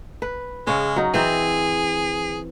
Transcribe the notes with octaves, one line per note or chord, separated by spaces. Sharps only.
B4
C#3 G#3 C#4
F#3 D#4
E3 C4 G#4